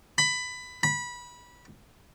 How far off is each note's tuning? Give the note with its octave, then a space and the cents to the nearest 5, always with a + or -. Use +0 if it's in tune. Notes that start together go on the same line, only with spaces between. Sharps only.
B5 +15
B5 -20